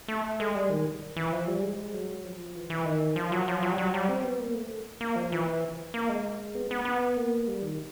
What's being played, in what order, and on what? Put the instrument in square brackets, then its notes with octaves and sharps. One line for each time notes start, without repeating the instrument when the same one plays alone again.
[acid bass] A3
G#3
G3
D#3
E3
F3
G3
G#3
F#3
F3
E3
E3
D#3
F3
F#3
F3
F#3
G3
F#3
G3
C4
B3
A#3
A3
A#3
F3
E3
A#3
G#3
B3
B3
B3
A#3
G3
D#3